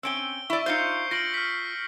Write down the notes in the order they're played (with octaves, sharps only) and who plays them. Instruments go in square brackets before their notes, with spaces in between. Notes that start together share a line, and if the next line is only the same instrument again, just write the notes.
[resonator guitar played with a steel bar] C4 C#4 G5 [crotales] E6 D7 G7
[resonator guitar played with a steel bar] E4 D5 [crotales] C#6
[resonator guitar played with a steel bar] D#4 F4 C5 [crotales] G6 C7 C#7
[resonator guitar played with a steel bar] F4 [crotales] A#6 D7 F#7
[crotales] F6 B6